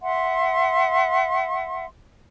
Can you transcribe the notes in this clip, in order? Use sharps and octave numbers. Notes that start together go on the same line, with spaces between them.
E5 F#5 C6